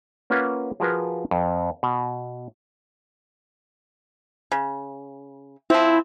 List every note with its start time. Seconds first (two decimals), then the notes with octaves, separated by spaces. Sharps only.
0.30 A#3 C#4 F4 B4 F#5
0.80 F3 F4 F#4 G#4 A#4 B4
1.31 F2
1.83 B2
4.52 C#3
5.70 F3 C4 E4